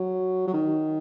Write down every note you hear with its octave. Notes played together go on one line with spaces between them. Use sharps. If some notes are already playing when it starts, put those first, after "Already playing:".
Already playing: F#3
F#3
D#3